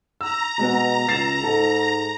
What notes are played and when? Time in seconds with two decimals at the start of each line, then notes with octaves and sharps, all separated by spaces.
0.21 A#5 E6
0.59 B2 G#3 B3
1.09 C#2 A6 C7 E7
1.44 G#2 A4